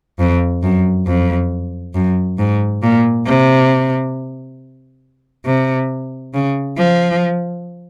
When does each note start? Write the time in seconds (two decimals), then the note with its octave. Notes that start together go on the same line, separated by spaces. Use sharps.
0.19 F2
0.63 F#2
1.07 F2
1.95 F#2
2.39 G#2
2.83 A#2
3.26 C3
5.46 C3
6.34 C#3
6.78 F3